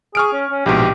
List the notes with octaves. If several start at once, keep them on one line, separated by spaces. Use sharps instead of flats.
G#4 C#6 F6 D7
C#4
C#4
A#1 G#2 B2 G4
G4